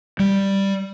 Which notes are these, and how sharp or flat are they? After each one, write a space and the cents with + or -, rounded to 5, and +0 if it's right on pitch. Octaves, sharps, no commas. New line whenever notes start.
G3 +0